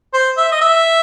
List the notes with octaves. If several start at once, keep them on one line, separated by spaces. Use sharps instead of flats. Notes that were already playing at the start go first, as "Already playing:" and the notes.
C5
E5
D#5
E5